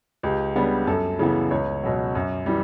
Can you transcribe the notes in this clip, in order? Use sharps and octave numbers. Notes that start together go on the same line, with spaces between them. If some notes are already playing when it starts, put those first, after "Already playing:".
C#2 G4
C#3 G3 B3 D4
F#2 A4
C#3 E3 B3
C#2 C#5
B2 F#3
F#2
E3 G3